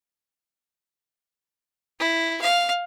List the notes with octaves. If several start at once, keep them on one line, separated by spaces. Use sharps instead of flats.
E4
F5